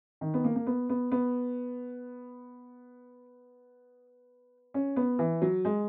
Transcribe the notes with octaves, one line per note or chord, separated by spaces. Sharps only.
D#3
B3
A#3
A#3
B3
B3
B3
C#4
B3
E3
F#3
G#3